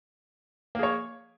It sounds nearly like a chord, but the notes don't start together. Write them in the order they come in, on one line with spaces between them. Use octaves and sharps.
A#3 G#4 C#5